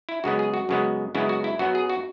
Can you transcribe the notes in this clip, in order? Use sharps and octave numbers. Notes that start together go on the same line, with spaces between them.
E4
F#2 C#3 G#3 B3 F#4
G#4
F#4
F#2 C#3 G#3 B3
F#2 C#3 G#3 B3 E4
F#4
E4
F#2 F#3 B3 F#4
G#4
F#4